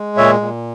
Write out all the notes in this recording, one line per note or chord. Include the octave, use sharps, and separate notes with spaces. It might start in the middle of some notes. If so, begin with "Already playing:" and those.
Already playing: G#3
A#2 C#5 E5
A#2